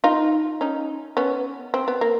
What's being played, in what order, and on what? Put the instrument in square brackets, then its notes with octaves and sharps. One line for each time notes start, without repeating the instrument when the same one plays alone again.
[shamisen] D#4 F4
C#4 D#4
B3 C#4
C4
B3
A#3